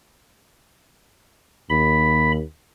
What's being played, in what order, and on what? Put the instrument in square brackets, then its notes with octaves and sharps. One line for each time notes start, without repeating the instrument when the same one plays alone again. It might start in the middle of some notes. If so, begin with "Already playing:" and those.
[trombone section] D#2 [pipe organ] B5